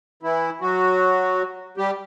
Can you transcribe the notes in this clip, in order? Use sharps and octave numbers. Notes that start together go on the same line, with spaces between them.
E3 E4
F#3 F#4
G3 G4